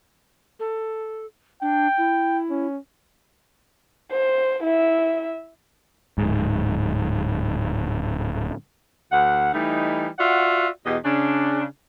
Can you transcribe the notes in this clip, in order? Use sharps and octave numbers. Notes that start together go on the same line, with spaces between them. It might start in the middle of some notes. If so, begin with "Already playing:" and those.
A4
D4 G5
E4
C#4
C5
E4 E5
D1 G#2
D2 F#5
E3 G3 A3 D#4
F4 F#4 D5 E5 F#5
E2 B2 G4 D#5
C#3 D4